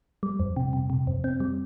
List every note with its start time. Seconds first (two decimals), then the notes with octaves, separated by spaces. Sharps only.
0.23 G3
0.40 F2
0.56 C3
0.73 C3
0.90 C3
1.07 F2
1.24 C4
1.40 G3